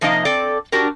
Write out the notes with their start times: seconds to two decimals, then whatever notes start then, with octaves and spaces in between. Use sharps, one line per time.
0.01 C3 F3 A#3 D#4 D#5 F5
0.25 C4 A4 D5
0.72 D4 F#4 G4 A#4